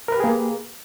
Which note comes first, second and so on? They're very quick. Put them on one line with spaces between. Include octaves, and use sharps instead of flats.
A#4 B4 G4 G#4 A#3